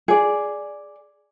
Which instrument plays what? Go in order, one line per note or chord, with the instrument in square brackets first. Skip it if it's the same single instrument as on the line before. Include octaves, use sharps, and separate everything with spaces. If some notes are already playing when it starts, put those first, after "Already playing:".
[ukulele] G#4 D5